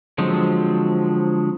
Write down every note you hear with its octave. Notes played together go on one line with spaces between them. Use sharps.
D3 F3 F#3 G#3 C4